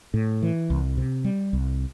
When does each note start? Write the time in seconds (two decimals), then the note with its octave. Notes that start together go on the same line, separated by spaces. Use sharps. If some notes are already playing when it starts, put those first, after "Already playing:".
0.14 A2
0.42 E3
0.70 C2
0.98 C3
1.24 G3
1.53 C2